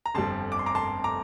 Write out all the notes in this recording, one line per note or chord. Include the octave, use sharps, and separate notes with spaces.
A#5
G1 F2 D3 G3 A5 C6
D6
C6
A#5 D6
A5 C6
A#5 D6